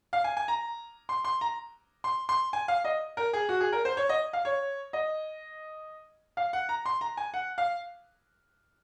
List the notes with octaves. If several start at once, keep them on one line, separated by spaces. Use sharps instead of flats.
F5
G#5
G#5
A#5
C6
C6
A#5
C6
C6
G#5
F5
D#5
A#4
G#4
F#4
G#4
A#4
C5
C#5
D#5
F5
C#5
D#5
F5
F#5
A#5
C6
A#5
G#5
F#5
F5